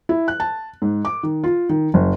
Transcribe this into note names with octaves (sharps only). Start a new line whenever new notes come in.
E4
F#6
A5
G#2
D6
D#3
F4
D#3
F#1